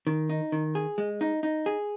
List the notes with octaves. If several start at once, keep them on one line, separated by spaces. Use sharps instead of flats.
D#3
D#4
D#3
G#4
G#3
D#4
D#4
G#4